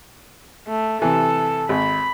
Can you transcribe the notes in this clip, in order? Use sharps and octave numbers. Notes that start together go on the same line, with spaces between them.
A3
C3 E3 A4
G#1 B5